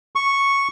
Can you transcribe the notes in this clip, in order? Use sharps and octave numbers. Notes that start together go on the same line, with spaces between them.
C#6